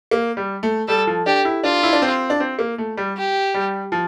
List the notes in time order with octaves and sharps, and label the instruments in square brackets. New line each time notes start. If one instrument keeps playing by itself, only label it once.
[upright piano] A#3
G3
A3
[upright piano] G3 [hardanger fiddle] A4
[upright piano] F3
[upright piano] D4 [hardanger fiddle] G4
[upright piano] E4
[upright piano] D4 [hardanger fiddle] F4
[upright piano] E4
D4
C4
D4
C4
A#3
A3
G3
[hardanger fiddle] G4
[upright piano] G3
F3